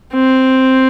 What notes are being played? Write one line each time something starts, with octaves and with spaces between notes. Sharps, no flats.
C4